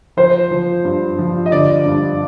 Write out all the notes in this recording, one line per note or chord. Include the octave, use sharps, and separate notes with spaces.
F3 C5
F3
G2
F3
D#5
D3 D5
G2